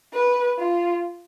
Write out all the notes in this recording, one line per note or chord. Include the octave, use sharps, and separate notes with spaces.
B4
F4